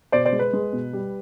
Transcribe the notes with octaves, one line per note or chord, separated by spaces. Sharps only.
B2 C5 D5
C5 D5
G#3
B4
G#3
B2
G3